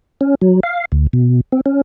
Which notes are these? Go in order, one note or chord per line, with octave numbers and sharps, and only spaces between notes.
C#4
F#3
F5
D2
B2
C4
C#4